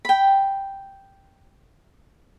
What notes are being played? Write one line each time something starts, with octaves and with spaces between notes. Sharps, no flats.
G5 B5